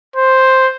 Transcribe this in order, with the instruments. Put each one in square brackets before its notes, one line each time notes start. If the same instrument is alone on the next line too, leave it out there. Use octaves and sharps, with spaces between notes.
[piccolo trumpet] C5